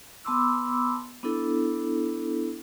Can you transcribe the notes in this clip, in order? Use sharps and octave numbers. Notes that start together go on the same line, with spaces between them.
B3 A5 B5 C6 D6 E6
B3 D4 E4 A4